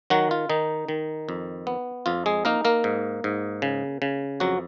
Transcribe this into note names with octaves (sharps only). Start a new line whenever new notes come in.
D#3 F#3 F#4
F4
D#3 D#4
D#3
F2
B3
F2 F4
G#3 G#4
A#3 D#4 A#4
A#3 A#4
G#2
G#2
C#3
C#3
F2 F#3 F#4